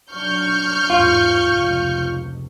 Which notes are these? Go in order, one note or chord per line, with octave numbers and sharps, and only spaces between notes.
F#3 D4 C#6 F6 G6
E2 G#2 F4
F1 C#2